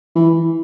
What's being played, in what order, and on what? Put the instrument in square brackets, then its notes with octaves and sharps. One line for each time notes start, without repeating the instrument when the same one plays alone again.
[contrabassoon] E3